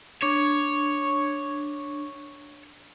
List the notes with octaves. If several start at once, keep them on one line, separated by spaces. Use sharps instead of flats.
D4 C#5